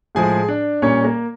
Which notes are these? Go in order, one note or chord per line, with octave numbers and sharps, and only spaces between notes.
A2 F3 G#3 G#4 G#5
D4 D5
A#2 G3 A#3 C#4 C#5
A#3 A#4